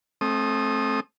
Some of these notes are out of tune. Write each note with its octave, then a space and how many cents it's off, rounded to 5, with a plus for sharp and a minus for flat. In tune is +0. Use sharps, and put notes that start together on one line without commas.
A3 -20 C4 +25 D#6 -10